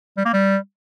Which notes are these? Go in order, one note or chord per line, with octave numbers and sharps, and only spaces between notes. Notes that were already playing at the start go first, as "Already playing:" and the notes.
G3
A#3
G3